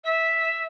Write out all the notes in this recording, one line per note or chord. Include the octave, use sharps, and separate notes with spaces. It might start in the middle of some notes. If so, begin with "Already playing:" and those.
E5